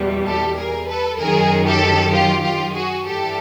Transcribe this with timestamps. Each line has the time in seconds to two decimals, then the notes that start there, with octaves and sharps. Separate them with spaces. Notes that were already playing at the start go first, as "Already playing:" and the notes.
Already playing: E2 B2 G3
0.26 G4 A4
0.57 G#4 A#4
0.89 A4 B4
1.19 F#2 D#3 F#3 G#4 A#4
1.66 G4 A4
2.13 F4 G4
2.43 F4 G4
2.75 F#4 G#4
3.06 G2 E3 G3 G4 A4